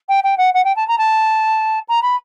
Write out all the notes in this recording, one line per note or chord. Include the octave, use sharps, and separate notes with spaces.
G5
G5
F#5
F#5
G5
A5
A#5
A5
A#5
B5